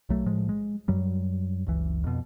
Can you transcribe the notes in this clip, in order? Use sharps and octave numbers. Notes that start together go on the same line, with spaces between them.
B1 F#3 A3
A2 F3 G#3
G#3
F#2 F#3 G3
F#1 C#2 E3
F2 B2